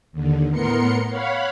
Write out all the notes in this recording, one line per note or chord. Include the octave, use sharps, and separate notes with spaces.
D#2 D3
A2 B3 A#4 C6 C#7
C#5 F5 F#5 B5